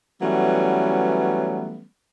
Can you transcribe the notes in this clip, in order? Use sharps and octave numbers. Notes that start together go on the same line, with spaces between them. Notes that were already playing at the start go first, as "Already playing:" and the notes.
E3 F#3 G3 A3 B3 C#4